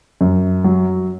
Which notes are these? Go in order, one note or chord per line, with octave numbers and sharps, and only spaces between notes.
F#2
F#3